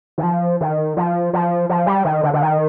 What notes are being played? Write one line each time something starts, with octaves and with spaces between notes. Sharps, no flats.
D#3
F3
D#3
F3
F3
F3
G3
D#3
D3
D3
D#3